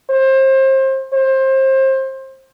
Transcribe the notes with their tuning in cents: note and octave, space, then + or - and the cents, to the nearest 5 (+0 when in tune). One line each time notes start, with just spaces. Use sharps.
C5 +30
C5 +25